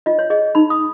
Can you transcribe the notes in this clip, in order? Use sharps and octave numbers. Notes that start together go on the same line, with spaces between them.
F4 D#5
C#5
G#4 D#5
D#4 B5
D#6